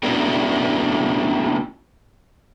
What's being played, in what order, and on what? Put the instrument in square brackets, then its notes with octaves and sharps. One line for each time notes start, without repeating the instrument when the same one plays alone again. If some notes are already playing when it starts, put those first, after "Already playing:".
[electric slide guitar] A3 B3 C#4 D4 E4 F#4